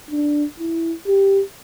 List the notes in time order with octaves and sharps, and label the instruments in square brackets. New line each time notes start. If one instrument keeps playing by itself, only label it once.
[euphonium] D4
E4
G4